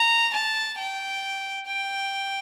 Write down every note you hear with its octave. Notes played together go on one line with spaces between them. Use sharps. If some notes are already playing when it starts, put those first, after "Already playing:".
Already playing: A#5
A5
G5
G5